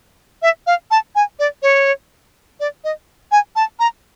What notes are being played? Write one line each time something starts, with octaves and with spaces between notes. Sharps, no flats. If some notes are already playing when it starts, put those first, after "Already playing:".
E5
F5
A5
G#5
D5
C#5
D5
D#5
G#5
A5
A#5